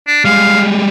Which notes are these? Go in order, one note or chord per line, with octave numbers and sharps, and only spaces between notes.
D4
G3 G#3 F5